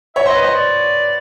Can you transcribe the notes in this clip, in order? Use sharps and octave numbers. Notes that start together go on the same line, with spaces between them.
C#5 E5
C5 D#5
B4
C5 D#5
D5